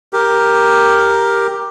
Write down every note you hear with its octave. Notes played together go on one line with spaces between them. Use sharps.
G4 A#4